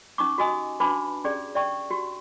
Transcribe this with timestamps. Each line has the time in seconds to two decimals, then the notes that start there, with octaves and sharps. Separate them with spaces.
0.18 C#4 D#4 C#6 D6
0.38 F#4 G4 D#5 G#5 D#6
0.80 D4 F#4 B4 A5 B5 D6
1.24 C#4 G4 G#4 D5
1.55 D5 E5 G5 C#6
1.90 F#4 G4